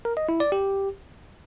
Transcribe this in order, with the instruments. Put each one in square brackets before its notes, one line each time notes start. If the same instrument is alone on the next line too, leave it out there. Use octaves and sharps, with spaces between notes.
[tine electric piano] A#4
D#5
E4
D5
G4